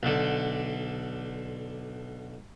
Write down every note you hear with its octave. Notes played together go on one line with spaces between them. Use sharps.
B1 D3